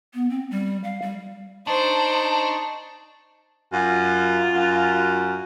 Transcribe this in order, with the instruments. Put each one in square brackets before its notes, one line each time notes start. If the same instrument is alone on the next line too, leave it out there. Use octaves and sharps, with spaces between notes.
[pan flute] B3
C4
G3
F5
G3
[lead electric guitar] D4 [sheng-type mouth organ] D#4 A5 C#6 [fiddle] C5
[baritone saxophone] F#2 [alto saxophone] F4
[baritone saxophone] F#2